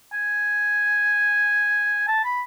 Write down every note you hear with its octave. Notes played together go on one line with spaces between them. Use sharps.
G#5
A5
B5